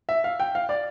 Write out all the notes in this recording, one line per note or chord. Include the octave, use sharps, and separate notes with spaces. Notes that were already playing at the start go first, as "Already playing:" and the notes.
E5
F5
G5
F5
D5